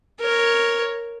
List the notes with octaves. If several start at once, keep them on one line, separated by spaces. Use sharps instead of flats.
A#4 C#5